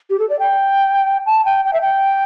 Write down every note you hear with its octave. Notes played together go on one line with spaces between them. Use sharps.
G4
A4
D5
G5
A5
G5
G5
E5
G5